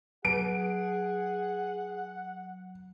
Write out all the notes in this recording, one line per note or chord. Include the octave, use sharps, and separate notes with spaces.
F#3 G#4 F#5 D7